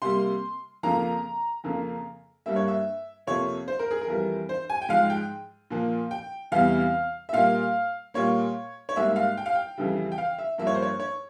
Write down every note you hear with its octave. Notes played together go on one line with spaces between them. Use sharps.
C3 G3 A#3 C6
F2 C#3 F3 A#3 A#5
F2 C#3 F3 A#3
G2 G3 A#3 E5
C#5
E5
F2 C3 F3 A#3 C#5
C5
A#4
G#4
A#4
F2 E3 G3
C5
G#5
G5
G#2 F3 G#3 F5
G5
A#2 F3 A#3
G5
E2 C3 E3 G3 F5
E5
A#2 G3 A#3 F5
A#2 G3 A#3 C#5
C#5
G#2 G3 A#3 E5
E5
F5
G5
F5
G5
F2 C#3 E3 G3
G5
F5
E5
G2 F3 A#3 E5
C#5
C5
C#5
C#5